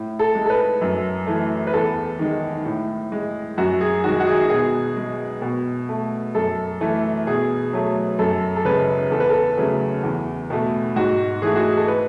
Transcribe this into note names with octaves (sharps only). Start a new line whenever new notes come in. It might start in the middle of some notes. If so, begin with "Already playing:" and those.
Already playing: A2
A4
G#3
A4
B4
F#2
E3 A3
B4
E2 A4
D#3 G#3
A2
G#3
F#2 F#4
G#4
D#3 G#3 F#4
F#4
G#4
B2 G#4
G#3
B2
A3
F#2 A4
E3 A3
B2 G#4
F#3 A3
F#2 A4
A4
C#3 G#3 B4
E2 A4
B4
A4
C#3 F#3 A3
E2
B2 A3
G#2 F#4
E3 A3 G#4
F#4
G#4
A4
B4